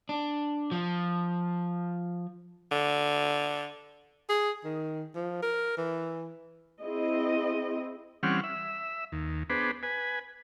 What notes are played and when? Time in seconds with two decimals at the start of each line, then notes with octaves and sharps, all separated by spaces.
0.09 D4
0.72 F3
2.71 D3
4.29 G#4
4.64 D#3
5.15 F3
5.42 A#4
5.78 E3
6.81 C4 E4 G#4 D#5
8.23 E3 G3 C4 C#4 F#5 F6
8.44 E5
9.12 D#2
9.50 B3 D4 G#4 B4 C5
9.83 B4 G#5